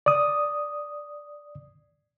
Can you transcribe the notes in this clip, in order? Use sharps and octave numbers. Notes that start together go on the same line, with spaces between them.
D5 D#6